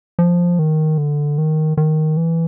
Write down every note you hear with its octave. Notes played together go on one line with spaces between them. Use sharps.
F3
D#3
D3
D#3
D#3
E3